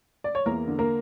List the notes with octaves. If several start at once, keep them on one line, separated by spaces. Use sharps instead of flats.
D5
C#5
E2 A#3 A#4
D3
A#3 A#4